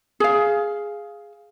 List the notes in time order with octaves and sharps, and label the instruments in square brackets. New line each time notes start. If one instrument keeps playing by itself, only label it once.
[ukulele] G#4 F5